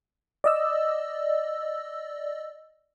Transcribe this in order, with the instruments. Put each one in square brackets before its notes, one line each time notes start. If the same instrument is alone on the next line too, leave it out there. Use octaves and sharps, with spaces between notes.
[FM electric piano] D5 D#5 E6